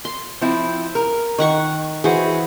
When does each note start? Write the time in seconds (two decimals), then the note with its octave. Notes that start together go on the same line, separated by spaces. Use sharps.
0.05 C6
0.41 F3 C4 E4
0.95 A#4
1.38 D#3 F#5 C#6
2.04 E3 F#4 G#4 C5